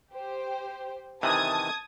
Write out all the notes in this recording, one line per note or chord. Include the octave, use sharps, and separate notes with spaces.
G4 C5
C3 D#3 E3 A5 D#6 G#6